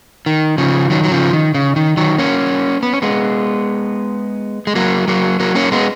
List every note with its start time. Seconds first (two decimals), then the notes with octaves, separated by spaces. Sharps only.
0.26 D#3
0.58 C#3 F3
0.90 D#3 F#3
1.04 F#3
1.11 C#3 F3
1.33 D#3
1.54 C#3
1.76 D#3
1.97 D#3 F#3
2.18 A#3 C#4
2.83 B3
2.93 C#4
3.02 G#3 B3
4.67 G#3
4.75 F#3 A#3
5.08 F#3 A#3
5.40 F#3 A#3
5.55 A#3 C#4
5.72 G#3 B3